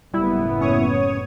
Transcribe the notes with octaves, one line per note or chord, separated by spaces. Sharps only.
F#1 A2 G3 B3 E4
C#4 C#5 D#6